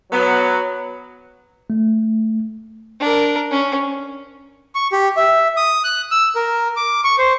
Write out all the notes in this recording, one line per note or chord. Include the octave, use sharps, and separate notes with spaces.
F#3 B3
A3
D4 A#4
C#4
C#6
G4
E5
D#6
F#6
E6
A#4
D6
C#6
C5